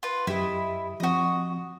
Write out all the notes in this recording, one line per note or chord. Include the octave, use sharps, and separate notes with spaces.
F4 B4
F#2 E4 G4 D#5
F3 C4 F#4 D#5